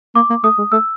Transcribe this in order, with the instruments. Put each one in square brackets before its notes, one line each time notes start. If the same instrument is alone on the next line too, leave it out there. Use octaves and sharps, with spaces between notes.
[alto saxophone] A#3 [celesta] D6
[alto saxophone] A#3
[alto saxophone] A3 [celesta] D#6
[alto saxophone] G#3
[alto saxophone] A3 [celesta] E6